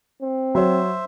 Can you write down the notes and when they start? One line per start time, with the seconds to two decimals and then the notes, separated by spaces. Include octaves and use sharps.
0.22 C4
0.55 F#3 C5 C#5 E5